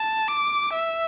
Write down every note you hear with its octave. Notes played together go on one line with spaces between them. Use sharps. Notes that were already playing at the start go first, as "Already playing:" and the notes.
Already playing: A5
D6
E5